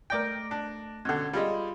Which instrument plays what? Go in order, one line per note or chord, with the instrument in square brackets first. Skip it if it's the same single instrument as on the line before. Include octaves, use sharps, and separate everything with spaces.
[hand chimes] A3 A#6 D7 [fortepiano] A#4 D5 G5
[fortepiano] D4
[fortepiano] B2 D3 [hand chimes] C#4 G#6
[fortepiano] G3 G#3 [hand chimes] F4 F5 B5